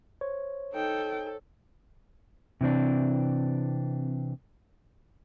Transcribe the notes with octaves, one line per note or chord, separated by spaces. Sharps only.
C5 C#5
D#4 A4 G5
C3 E3 C4 D4